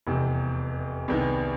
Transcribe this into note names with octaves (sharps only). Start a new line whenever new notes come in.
F1 E2 C3
C2 C3 D#3 G#3 B3